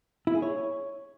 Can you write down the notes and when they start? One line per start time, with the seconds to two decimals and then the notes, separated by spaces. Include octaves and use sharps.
0.27 E4
0.35 G#4
0.42 C#5